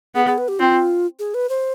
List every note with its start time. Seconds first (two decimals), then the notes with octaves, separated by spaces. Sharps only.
0.15 B3 G#4
0.26 G#4
0.38 B4
0.48 G4
0.59 C4 F4
1.19 G#4
1.34 B4
1.49 C5